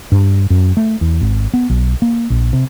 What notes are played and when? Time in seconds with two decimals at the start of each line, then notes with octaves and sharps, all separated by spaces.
0.12 G2
0.50 F#2
0.77 A3
1.01 E2
1.21 G#1
1.54 B3
1.70 B1
2.02 A#3
2.30 A#1
2.53 C3